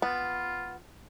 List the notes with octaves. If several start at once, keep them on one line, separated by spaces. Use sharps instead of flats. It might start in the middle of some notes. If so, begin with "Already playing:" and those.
B3 F4